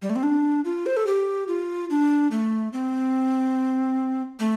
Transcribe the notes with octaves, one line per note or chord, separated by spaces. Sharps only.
G3
A3
C4
D4
F4
C5
A4
G4
F4
D4
A3
C4
A3